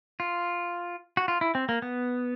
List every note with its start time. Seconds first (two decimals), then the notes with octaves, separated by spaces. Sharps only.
0.20 F4
1.17 F#4
1.28 F4
1.41 E4
1.55 C4
1.69 A#3
1.82 B3